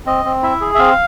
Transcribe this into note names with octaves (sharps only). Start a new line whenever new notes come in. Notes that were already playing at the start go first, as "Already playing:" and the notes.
C4 D#5
C4
E4 E5
G#4
E5
C4 F5